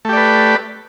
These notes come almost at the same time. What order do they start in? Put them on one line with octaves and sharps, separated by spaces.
A3 G4 D5 B4